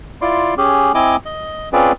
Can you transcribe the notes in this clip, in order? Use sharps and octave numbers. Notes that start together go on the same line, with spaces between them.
E4 F4 D5 C6
C#4 G4 G#4
C4 E4 D#5 G#5 D6
D#5
C4 C#4 F4 G#4 B4 D5